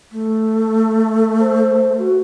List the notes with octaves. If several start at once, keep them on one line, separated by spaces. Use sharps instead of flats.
A3
C5
F#4